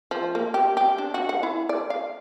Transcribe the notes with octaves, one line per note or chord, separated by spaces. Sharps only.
F3
A#3
G4
G4
D4
F#4
F#5
E4
D5
F5